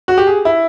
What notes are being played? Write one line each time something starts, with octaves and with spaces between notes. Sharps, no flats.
F#4
G4
G#4
E4